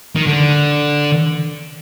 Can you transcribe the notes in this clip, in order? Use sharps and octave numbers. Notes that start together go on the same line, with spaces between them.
D#3
D3